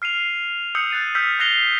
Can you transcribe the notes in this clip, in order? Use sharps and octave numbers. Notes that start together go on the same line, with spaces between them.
F6 C7 D#7 F7
D#6 E6 G6 C7 C#7 F7
F#6 A6 D#7
E6 F6 G6 B6 C7
E6 F#6 A#6 C7 F7 G7